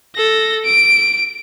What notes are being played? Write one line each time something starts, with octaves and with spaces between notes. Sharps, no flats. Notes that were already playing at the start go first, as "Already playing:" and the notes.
A4 A#6
D7